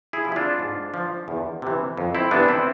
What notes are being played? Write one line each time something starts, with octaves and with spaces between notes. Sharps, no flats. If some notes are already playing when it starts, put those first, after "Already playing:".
E4 G#4
C3 F3
E4
D4 F4
G#2
F3
E2
C3 E3
F2
C4 E4
C3 E3 B3 D4
C4 E4